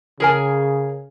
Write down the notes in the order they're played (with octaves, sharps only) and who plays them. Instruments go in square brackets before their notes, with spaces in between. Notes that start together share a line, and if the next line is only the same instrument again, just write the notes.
[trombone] C#3 [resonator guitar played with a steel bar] G#4 A#4 G#5